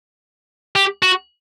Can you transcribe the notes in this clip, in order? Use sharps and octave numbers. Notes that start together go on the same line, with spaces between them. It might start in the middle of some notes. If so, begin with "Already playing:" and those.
G4
F#4